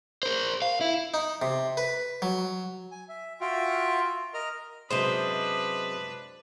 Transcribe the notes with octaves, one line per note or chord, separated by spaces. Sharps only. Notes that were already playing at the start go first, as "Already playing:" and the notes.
A#4 C5
F5
E4
D#4
C3
B4
F#3
G#5
E5
F4 F#4 E5 F5 G5
A#4 D#5 F6
F#2 C3 G#3 D4 B4 C5 D#5